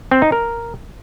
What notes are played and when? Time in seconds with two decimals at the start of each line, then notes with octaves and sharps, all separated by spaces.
0.11 C4
0.22 D#4
0.32 A#4